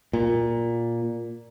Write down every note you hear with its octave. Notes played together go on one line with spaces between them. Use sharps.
A#2